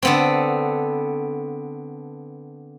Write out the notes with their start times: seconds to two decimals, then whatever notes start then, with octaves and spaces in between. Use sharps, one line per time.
0.03 D3 B3 C4